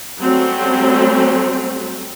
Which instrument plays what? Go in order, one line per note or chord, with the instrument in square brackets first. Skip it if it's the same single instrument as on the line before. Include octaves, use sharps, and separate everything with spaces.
[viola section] F#3 G3 A3 C4 C#4